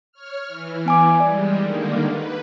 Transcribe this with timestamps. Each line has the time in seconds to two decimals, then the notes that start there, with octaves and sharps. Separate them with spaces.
0.12 C#5 F6
0.47 E3
0.86 B3 G#5 D6
1.20 G3 G#3 D5
1.61 D3 D#3 A#3
2.10 B4